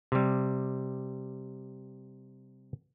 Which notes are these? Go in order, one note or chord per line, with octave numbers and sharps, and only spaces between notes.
C3 G3